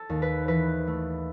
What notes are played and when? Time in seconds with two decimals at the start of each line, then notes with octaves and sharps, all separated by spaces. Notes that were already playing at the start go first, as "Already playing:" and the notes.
Already playing: A4
0.09 D#2
0.22 B4
0.48 E3 B4
0.87 A3